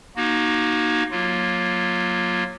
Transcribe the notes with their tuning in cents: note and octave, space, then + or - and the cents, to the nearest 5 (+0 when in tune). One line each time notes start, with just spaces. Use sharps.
A#3 +30 D#4 -10 F#4 +0
F#3 -20 A#3 +10 F4 -5